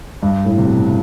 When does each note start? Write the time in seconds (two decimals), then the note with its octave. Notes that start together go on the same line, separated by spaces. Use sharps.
0.23 G2
0.45 A2
0.58 C3
0.67 B2